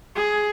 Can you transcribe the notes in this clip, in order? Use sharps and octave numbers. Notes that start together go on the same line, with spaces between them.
G#4